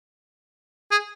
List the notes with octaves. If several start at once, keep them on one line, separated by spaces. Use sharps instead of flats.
G#4